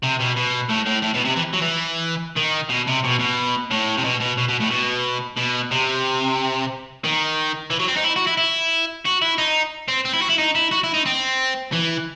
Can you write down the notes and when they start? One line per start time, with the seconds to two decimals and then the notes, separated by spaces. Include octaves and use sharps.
0.03 C3
0.20 B2
0.36 B2
0.70 A2
0.86 A2
1.03 A2
1.14 B2
1.25 C3
1.36 E3
1.54 F#3
1.62 E3
2.37 D#3
2.70 B2
2.87 C3
3.04 B2
3.20 B2
3.71 A2
3.97 C3
4.04 B2
4.20 B2
4.38 B2
4.48 B2
4.60 A2
4.70 B2
5.37 B2
5.71 C3
7.04 D#3
7.71 E3
7.80 F#3
7.88 C4
7.96 D#4
8.04 E4
8.16 F#4
8.27 E4
8.37 E4
9.05 F#4
9.22 E4
9.38 D#4
9.88 C4
10.05 C4
10.13 E4
10.22 F#4
10.29 E4
10.38 D#4
10.55 E4
10.71 F#4
10.84 E4
10.94 D#4
11.06 C4
11.72 E3